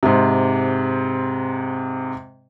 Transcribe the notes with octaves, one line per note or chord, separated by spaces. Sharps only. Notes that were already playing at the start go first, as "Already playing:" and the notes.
G#2 C3